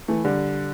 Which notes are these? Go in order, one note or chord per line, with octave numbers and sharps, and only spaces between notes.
E3 A3
D3 G3